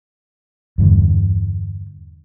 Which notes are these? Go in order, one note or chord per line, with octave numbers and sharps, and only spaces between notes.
E2 G2 D3